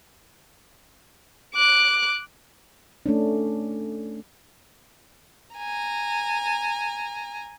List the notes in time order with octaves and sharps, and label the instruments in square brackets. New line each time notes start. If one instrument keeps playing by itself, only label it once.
[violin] D6 F#6
[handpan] A3 C#4 D4
[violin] G#5 A#5